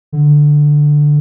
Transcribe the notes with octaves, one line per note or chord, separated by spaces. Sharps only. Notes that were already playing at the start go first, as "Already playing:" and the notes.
D3